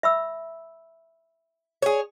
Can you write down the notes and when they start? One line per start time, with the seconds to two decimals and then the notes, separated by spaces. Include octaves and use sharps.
0.03 E5 B5 E6
1.82 G#4 C#5